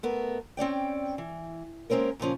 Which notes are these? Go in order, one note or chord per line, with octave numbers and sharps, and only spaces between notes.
A3 B3 A#4
C4 C#4 D5 G5
E3
G#3 A#3 C4 C#4 A#4
A#2 C#3 F3 C#4